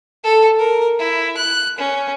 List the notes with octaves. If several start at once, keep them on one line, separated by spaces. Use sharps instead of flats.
A4
A#4
E4
F#6
C#4